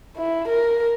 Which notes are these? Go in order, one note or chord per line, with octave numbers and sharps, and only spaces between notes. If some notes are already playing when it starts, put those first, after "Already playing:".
E4
A#4